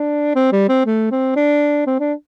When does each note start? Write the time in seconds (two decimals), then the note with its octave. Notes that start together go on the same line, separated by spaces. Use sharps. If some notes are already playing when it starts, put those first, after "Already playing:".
Already playing: D4
0.35 C4
0.52 G3
0.69 C4
0.86 A3
1.11 C4
1.36 D4
1.87 C4
2.00 D4